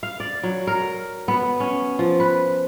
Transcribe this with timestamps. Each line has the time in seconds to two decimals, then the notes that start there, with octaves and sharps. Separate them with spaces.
0.03 F5
0.20 D5
0.43 F#3
0.67 A#4
1.28 B3
1.60 C#4
1.99 F3
2.20 B4